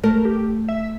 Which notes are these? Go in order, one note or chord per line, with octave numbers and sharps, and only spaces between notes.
A3 A#4
G4
E5